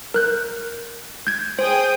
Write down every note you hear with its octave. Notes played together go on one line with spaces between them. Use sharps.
A#4 F#6 G6
G6 G#6
G#4 C5 G5 D#6